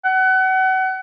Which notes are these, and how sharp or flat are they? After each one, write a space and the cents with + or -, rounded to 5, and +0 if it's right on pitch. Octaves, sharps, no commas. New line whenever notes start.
F#5 +30